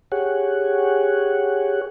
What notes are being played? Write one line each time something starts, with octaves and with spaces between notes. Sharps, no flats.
G4 G#4 C#5 F#5